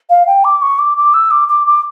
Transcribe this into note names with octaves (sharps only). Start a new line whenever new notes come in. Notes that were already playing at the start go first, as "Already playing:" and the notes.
F5
G5
D6
C#6
D6
D6
E6
D6
D6
D6